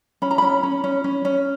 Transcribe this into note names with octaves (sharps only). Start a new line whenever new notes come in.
C#4 B5
A#5
C#4 B5
C#4
C#4
C#4
C#4